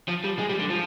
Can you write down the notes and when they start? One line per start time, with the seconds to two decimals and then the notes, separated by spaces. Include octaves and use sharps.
0.08 F3
0.24 G3
0.39 G#3
0.49 G3
0.60 D3
0.70 F3